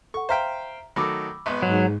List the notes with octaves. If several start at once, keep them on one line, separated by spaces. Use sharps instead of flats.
A4 F#5 C#6
C5 E5 F5 G5 A#5 B6
D#3 F#3 A3 B5 D6 E6
G#1 B3
G#2 F#3